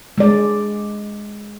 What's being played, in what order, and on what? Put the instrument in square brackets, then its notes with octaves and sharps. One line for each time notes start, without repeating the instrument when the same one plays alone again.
[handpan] G#3 D5